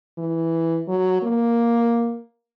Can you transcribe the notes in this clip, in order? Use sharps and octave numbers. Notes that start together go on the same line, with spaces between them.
E3
F#3
A#3